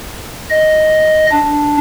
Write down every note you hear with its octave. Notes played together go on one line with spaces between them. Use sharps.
D#5
D4